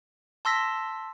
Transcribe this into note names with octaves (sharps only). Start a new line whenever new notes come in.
A5 C6 E6 A#6 B6